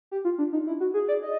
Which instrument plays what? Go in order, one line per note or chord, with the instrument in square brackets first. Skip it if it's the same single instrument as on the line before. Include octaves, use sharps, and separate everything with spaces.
[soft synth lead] G4
F4
D4
D#4
E4
F#4
G#4
D5
D#5